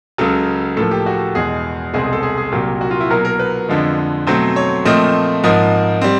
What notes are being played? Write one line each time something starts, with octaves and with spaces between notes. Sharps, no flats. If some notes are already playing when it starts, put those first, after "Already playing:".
C#2 C#3 F#3 A4
A2 F3 A#3 A4
G4
F#4
E2 B2 G#3 G#4
C2 B2 G#3 C4 G#4
G#4
A4
G#4
G#4
C2 A#2 F#3 A#3 G4
F#4
F4
E4
B2 F#3 A#3 A#4
A#4
B4
F2 D3 F3 G#3
B2 F#3 A3 C4 C5
C#5
A#2 F3 A3 C4 D#5
G#2 F3 A#3 D#5
G3 C4